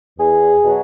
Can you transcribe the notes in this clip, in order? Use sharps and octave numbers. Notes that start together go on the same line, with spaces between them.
E2 G#4
B2 F#3